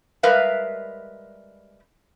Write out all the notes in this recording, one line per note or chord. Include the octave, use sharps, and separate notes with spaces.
G3 G#3 A#4 B4 E5 F5